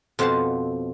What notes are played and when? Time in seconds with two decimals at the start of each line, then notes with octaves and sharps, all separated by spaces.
0.19 F2 B2 C4 F5 F#5 A5